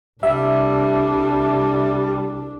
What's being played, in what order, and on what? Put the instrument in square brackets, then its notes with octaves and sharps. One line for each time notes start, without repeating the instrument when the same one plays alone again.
[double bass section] C2 [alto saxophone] G3 [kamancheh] D4 A4 [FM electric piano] E5